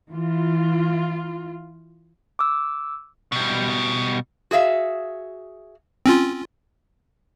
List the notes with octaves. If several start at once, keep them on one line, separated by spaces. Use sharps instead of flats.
E3 F4
D6 E6
B2 G3
F#4 G#4 E5 F5
C4 C#4 F4